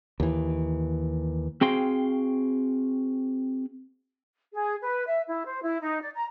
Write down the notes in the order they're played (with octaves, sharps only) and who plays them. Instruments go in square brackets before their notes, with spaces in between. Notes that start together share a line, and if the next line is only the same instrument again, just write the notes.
[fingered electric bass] D#2 E3
[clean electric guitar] C4 F#4 G#4 F5 G5 C6
[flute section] G#4
B4
E5
E4
C5
E4
D#4
D5
A#5